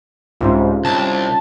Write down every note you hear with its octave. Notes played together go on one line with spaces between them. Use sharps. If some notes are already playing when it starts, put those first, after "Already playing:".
C2 G#2 C#4 D#4 F4
C2 A5